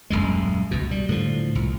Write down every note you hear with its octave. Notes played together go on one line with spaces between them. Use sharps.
D#1 B1 F#2 G#3
C#2 B2
G3
A2 D3 E3 F3
C2